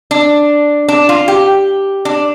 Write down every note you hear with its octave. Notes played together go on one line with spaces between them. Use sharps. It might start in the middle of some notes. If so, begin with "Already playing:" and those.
D4
D4
F4
G4
D4